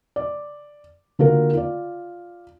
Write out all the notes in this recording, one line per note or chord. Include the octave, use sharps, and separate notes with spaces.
D5
D3 A#3 F4 F#4 A#4
F4 D5